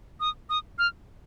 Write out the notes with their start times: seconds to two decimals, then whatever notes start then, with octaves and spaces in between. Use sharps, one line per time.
0.20 D#6
0.50 D#6
0.79 F6